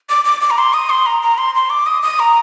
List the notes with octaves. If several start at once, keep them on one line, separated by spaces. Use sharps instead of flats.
D6
D6
D6
A#5
C6
D#6
C6
A#5
A#5
C6
C6
D6
D#6
D#6
A#5